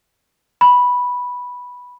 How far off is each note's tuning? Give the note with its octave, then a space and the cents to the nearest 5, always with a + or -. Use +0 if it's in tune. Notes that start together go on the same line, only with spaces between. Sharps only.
B5 -5